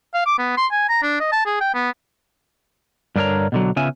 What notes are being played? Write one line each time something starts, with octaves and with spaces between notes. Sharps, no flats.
F5
D6
B3
C6
G#5
A#5
D4
D#5
A5
G#4
G5
B3
G2 D3 D4 A#4 C#5 A#5
B2 D3 F#3
C#3 B3 C#4 F4 E5 G#5